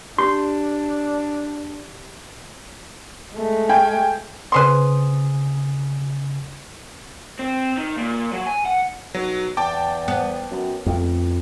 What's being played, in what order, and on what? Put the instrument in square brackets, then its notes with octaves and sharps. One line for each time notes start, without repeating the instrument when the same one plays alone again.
[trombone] D4 [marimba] G4 [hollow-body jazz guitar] C6
[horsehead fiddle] G#3 A3
[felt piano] F5 G5 G#5
[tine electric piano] C#3 G#5 D#6 [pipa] B4 C5 C6
[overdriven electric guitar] C4
D#3
A#2
F#3
G#5
F#5
[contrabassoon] B1 [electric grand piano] F#3
[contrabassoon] E2 [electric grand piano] G5 A5 D6
[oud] B3
[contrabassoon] F#2
[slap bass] F2 [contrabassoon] A2